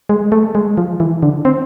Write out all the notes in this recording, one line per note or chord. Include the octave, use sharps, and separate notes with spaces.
G#3
A3
G#3
F3
E3
D3
C4